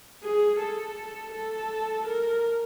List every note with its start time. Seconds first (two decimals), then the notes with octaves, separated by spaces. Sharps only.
0.23 G#4
0.59 A4
1.32 A4
2.07 A#4